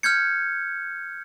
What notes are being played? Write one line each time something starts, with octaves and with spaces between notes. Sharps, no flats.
F6 G6 G#6 C#7